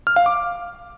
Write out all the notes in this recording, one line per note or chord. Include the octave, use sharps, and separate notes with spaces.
F6
F5
D6